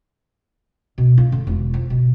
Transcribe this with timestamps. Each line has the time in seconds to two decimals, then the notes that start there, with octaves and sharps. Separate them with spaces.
0.98 B2
1.18 F4
1.32 D3
1.47 E1
1.74 F3
1.90 B2